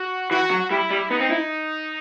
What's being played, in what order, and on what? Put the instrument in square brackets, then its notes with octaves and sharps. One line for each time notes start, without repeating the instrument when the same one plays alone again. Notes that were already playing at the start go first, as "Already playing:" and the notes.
Already playing: [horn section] F#4
[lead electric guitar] E3 [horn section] F#4
[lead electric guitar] F#3
[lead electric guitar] G3 [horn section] E4
[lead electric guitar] G3
[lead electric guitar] B3 [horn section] D#4
[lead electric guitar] C4
E4